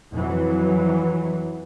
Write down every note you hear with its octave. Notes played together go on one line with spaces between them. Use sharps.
F2 E3 F#3